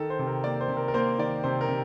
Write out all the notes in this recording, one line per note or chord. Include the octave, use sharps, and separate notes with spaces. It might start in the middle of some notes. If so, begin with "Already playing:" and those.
Already playing: D#3 A4
C5
C3
A#4
A#3 D5
C5
C3
A#4
A#4
A#3 C5
D#3 D5
C3 C5
A#4
C3